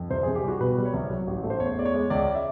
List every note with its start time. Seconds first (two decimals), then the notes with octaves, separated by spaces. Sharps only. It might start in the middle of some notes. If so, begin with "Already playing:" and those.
Already playing: F2
0.10 C2 C5
0.23 C2 G#4
0.35 G4
0.44 G3 F#4
0.60 B2 B4
0.77 G3
0.85 C#5
0.94 C2
1.10 F#3
1.27 A1
1.43 A3
1.50 C5
1.60 E2 C#5
1.77 E2 D5
1.85 C#5
1.94 G#3
2.10 C#2 D5
2.35 E5